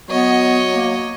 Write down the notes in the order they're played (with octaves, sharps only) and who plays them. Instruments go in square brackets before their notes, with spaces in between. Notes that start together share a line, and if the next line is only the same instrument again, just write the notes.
[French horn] F#3 [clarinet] B3 [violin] C#5 D#5
[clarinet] A#3